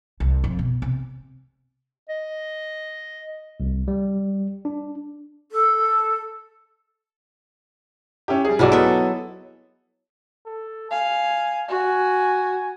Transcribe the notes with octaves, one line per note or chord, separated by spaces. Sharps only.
C2
F2
B2
C3
D#5
C2
G3
D4
A4
C#4 E4 G4
G3 G#4
B1 F#3 G#3 E4 D5
B3 A4 E5
A4
F5 G#5
F#4 G#5